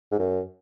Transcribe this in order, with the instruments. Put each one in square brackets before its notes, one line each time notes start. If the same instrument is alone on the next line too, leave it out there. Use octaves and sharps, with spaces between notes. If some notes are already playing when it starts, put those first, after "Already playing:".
[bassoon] G#2
F#2